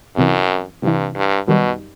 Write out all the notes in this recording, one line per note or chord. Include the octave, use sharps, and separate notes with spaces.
C2 F#2 C3 E3
C2 G2 C3 E3
G2
F#2 B2 D#3 G3